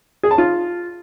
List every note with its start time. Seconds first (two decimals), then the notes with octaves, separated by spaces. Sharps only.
0.23 G#4
0.31 A5
0.38 F4